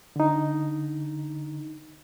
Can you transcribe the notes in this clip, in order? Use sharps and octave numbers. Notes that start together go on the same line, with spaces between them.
D3 D#4